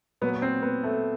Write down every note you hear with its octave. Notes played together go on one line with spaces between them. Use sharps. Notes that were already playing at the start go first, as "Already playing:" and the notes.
A#2 F#3 B3
C4
B3
A3